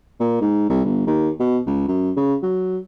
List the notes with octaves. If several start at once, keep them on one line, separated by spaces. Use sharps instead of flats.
A#2
G#2
C2
G1
D#2
B2
C#2
F#2
C#3
F#3